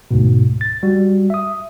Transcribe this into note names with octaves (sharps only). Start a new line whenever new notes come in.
D2 G#2 B2
A6
G3 F#4
E5 D#6